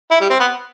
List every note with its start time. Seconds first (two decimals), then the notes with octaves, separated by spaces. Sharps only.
0.11 E4
0.21 G3
0.30 C4
0.40 B3